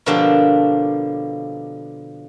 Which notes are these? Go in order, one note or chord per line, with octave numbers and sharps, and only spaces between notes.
B2 D3 F3 A#3 D4 G4